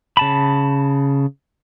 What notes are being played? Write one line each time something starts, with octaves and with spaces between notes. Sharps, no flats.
C#3 A5 B5